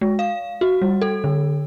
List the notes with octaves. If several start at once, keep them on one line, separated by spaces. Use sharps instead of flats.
G#3
F5
F#4
G3
A4
D3